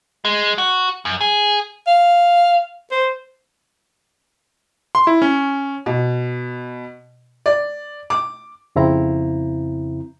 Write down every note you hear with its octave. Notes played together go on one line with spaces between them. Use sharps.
G#3
F#4
F#2
G#4
F5
C5
C6
E4
C#4
B2
D5
D6
F2 C#3 C4 E4 A#5